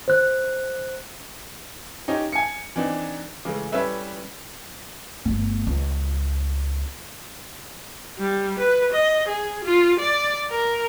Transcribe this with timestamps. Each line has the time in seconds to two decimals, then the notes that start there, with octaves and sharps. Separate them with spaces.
0.08 C5 F#6
2.08 C#4 D#4 G4
2.32 G#5 C#7
2.76 E3 C4 D4 D#4
3.45 C#3 E3 G#3 A3
3.72 G3 C#4 E4 A4 B4 E5
5.25 G1 A3
5.67 C#2
8.18 G3
8.59 B4
8.92 D#5
9.28 G#4
9.64 F4
9.99 D5
10.51 A#4